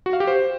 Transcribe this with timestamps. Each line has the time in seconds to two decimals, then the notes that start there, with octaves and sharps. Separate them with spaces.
0.06 F#4
0.13 F5
0.20 G4
0.27 C5